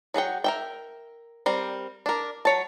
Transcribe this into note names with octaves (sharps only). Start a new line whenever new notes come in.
F#3 G#4 F#5 G5
A#4 E5 G5
G3 C4 A#4
D4 A#4
F#3 C#5 A5